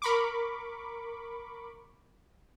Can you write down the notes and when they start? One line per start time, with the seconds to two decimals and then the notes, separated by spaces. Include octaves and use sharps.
0.02 A#4 B5 C#6 D6